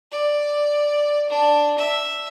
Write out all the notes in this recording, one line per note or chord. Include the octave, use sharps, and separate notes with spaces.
D5
D4
E5